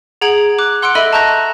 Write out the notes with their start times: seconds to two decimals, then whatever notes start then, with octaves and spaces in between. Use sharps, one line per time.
0.21 G#4 F#5 A#5 G#6 D7 F#7
0.59 D6 F#6
0.82 F#5 C6 E6 F#6 C#7 D7
0.95 A4 D#5 E5 B5 E6 D#7
1.13 A5 A#5 C#6 F#6 G6 A#6